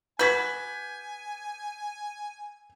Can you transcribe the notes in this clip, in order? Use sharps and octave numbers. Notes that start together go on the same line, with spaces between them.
F#4 B4 G#5 G6 G#6 B6